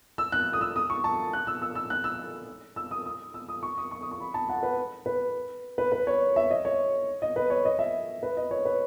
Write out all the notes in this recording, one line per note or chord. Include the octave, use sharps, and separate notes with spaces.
E6
F#6
D#6
E6
D#6
C#6
A5
F#6
E6
E6
E6
F#6
E6
E6
D#6
D#6
E6
D#6
C#6
D#6
C#6
D#6
C#6
B5
A5
F#5
B4
B4
B4
B4
C#5
E5
D#5
C#5
D#5
B4
C#5
D#5
E5
B4
D#5
C#5
B4